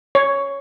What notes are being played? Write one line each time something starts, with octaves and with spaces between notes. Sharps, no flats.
C#5